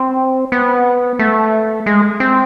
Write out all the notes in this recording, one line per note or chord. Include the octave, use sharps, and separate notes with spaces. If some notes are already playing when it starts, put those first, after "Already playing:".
Already playing: C4
B3
A3
G#3
C4